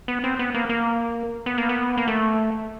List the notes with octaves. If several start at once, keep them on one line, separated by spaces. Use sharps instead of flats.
B3
C4
B3
A#3
A#3
B3
A#3
B3
A#3
A3